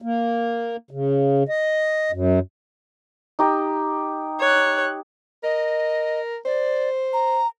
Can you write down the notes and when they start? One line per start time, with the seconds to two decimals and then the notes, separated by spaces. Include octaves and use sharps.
0.02 A#3
0.91 C#3
1.49 D#5
2.12 F#2
3.39 D#4 G4 D#5
4.40 C#5 F#6
5.44 A#4 D#5
6.46 C5 D5
7.13 A#5